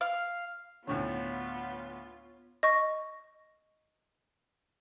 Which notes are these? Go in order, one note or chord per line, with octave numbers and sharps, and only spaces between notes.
F5
D2 A2 D3 B3 F4 C#5
D#5 C#6